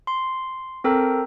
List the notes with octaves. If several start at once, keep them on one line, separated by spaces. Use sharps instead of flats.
C6
C4 A4 A#4 G5 A#5